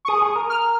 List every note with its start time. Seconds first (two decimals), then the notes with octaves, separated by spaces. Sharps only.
0.05 C#6
0.08 G#4 D#6
0.22 G#4
0.36 A#4
0.49 F6